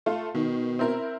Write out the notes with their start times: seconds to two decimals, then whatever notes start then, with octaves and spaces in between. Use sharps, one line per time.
0.06 A3 F4
0.35 B2 D#3
0.79 C4 E4 A#4